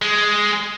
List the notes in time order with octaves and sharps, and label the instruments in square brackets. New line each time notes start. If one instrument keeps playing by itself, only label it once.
[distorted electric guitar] G#3